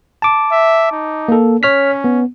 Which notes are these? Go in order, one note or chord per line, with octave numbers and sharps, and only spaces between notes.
A5 D6
E5
D#4
A#3 A4
C#4 C#5 F6 B6
B3